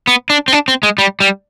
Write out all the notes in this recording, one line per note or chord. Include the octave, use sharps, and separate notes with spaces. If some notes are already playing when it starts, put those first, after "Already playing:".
B3
D4
C4
D4
C4
G#3
G3
G3